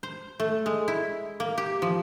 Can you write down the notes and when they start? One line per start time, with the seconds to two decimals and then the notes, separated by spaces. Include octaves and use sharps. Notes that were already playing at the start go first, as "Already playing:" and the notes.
0.03 C5
0.40 A3
0.66 G#3
0.88 E4
1.40 A#3
1.58 G4
1.82 F3